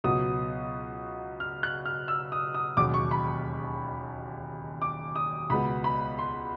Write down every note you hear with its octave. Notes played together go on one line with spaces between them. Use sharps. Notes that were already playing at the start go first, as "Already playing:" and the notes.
C#2 B2 F#3 B3 D#6
F6
F#6
F6
E6
D#6
D#6
E1 D#2 C#3 F#3 D6
C#6
B5
D6
D#6
C#2 B2 G#3 B3 B5
B5
C6